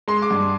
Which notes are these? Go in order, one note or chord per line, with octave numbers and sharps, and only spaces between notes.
G#3 C6
D6
G2